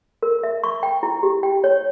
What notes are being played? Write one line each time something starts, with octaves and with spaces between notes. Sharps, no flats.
A#4
E5
C#6
G5
E4
G4
G5
C#5